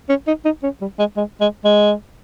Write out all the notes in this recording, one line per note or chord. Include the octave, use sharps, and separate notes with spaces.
C#4
D#4
D#4
C#4
G3
G#3
G#3
G#3
G#3